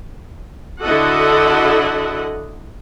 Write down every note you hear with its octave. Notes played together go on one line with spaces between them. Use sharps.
D3 E4 F#4 A4 D#5 F#5